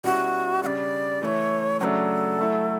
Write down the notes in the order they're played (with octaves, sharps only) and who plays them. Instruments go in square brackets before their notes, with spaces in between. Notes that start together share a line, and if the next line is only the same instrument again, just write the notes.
[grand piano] B2 G3 C#4 E4 [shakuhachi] F#4
[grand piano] C#3 G3 D4 [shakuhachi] D5 F#5
[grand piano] E3 A3 E4 [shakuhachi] C#5 D5
[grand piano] C#3 F#3 A3 D4 [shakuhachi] A4 C#5
[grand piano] F#3 A3 E4